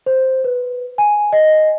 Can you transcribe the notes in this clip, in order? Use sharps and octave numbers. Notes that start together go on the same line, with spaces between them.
C5
B4
G#5
D#5